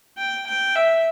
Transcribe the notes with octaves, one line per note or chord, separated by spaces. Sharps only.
G5
G5
E5